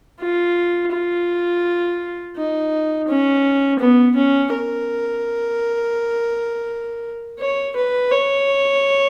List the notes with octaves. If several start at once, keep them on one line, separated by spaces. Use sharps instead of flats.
F4
F4
D#4
C#4
B3
C#4
A#4
C#5
B4
C#5